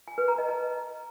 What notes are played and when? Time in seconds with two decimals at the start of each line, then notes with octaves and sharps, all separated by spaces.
0.08 G#5
0.18 B4
0.28 A#5
0.38 D#5
0.49 A5